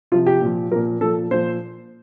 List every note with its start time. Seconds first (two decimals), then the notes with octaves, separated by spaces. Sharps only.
0.12 C3 F3 F4
0.26 G4
0.41 A#2 F3
0.71 F3 A#4
0.76 A#2
1.01 A#2 F3 A4
1.31 A#2 F3 C5